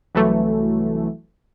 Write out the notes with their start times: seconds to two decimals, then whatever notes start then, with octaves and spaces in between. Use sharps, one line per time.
0.15 C2 E3 F#3 A3